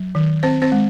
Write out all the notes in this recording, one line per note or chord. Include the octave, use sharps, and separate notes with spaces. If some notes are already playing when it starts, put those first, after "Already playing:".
Already playing: F#3
D#3
C4 C5
C4 C5
G#3